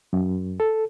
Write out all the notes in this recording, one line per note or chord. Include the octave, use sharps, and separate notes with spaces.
F#2
A4